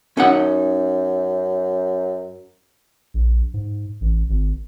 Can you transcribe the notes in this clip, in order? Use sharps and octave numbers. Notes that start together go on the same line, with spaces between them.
F#2 C#4 D#4 F#5
A#1
G#2
A1
G#1